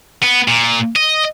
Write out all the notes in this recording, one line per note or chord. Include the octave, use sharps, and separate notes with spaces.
B3
A#2
D#5